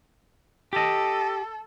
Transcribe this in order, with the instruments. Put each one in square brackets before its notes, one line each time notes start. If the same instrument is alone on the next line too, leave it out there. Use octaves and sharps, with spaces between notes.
[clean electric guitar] G4 D#5 [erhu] A4